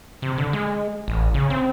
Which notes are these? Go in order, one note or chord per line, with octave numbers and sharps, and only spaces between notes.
C3
D3
G#3
A1
C#3
C4